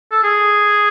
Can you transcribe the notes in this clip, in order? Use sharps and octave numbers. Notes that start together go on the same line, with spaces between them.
A4
G#4